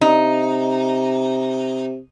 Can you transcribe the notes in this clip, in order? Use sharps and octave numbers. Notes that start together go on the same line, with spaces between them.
C3 D#4